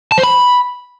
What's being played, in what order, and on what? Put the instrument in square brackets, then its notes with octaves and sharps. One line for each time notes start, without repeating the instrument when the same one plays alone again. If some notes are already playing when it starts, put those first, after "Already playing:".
[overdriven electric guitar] A5
C5
B5